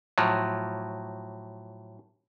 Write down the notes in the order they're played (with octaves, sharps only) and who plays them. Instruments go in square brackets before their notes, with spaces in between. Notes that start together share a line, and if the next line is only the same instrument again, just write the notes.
[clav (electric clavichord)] A2 F3 F#3